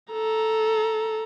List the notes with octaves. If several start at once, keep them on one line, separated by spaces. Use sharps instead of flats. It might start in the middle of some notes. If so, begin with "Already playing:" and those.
A4 A#5